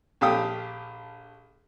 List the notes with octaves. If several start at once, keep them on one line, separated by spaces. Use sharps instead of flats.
A#1 G4 A4 F5 G5 D#6